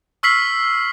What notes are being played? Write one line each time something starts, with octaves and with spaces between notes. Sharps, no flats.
C#6 E6 F6 B6 C7 F#7